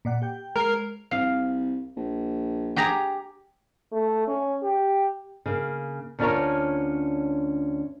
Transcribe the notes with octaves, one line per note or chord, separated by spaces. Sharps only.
A#2 D5 F#5
G4 G5
G#3 A#4 C7
C2 F5
A#1
G4 G#4 A#5
A3
C#4
G4
C#3 A#3
D2 C#4 D4 F4 A#4 C#5